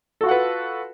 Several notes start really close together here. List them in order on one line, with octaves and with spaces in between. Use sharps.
A4 F#4 F4 F#5 B4